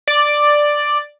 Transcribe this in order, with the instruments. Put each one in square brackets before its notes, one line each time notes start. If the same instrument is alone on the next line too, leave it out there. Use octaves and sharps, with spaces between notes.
[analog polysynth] D5